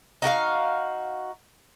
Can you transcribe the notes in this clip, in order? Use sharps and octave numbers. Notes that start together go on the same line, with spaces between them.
D#4 F#4 A#4 F5